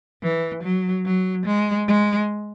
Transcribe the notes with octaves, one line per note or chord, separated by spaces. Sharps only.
E3
F#3
F#3
G#3
G#3